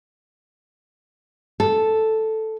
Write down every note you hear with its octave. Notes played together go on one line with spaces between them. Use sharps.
A4